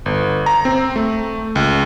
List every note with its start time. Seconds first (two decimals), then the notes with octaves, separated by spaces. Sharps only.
0.06 G1
0.46 A#5
0.65 C4
0.96 A3
1.56 C#2